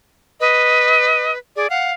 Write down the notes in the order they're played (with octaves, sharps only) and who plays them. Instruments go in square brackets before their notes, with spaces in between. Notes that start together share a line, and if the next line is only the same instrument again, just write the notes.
[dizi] B4 [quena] D#5
[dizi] G#4 [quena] D5
[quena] F5 [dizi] F#5